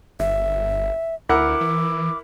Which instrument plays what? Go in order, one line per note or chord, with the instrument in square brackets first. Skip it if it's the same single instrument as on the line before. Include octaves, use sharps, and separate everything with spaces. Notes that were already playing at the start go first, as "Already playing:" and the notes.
[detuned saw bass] G1 [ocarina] E5
[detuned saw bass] D2 [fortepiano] E4 A#4 F#5 [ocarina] D6
[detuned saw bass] E3